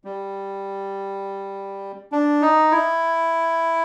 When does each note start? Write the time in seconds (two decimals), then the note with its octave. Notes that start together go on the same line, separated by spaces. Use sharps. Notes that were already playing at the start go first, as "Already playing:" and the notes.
0.05 G3
2.12 D4
2.42 D#4
2.71 E4